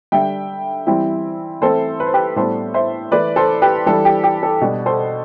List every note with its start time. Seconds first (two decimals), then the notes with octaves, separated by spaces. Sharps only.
0.12 D3 G3 D4 E5 G5
0.87 E3 G3 C4 E4
1.61 E3 A3 C4 E4 A4 C5
2.00 B4
2.07 C5
2.14 G4 B4
2.36 A2 G3 B3 D4 A4 C5
2.74 C5 E5
3.11 E3 A3 E4 B4 D5
3.36 A4 C5
3.62 G4 B4
3.86 E3 G3 D4 A4
4.05 G4
4.24 G4
4.43 A4
4.61 B2 G3 D4
4.86 A4 C5